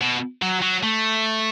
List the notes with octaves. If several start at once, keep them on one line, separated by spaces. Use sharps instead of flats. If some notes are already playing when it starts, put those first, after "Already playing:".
B2
F#3
F#3
A3